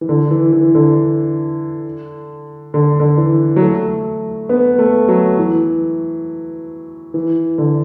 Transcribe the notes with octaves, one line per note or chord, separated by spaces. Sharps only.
E3
D3
E3
E3
D3
D3
D3
E3
F#3
A3
B3
A3
F#3
E3
E3
D3